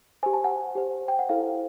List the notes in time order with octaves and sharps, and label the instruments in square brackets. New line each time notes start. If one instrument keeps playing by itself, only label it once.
[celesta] G4 C5 G#5
A5
F#5 G#5
G4 C5
G5
F#5
E4 A4 C5 F5